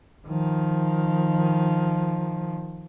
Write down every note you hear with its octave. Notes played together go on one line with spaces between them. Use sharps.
D#3 F3